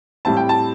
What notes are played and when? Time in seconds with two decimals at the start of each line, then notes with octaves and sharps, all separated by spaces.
0.25 A2 G3 C4 E4 A5
0.37 G5
0.49 A5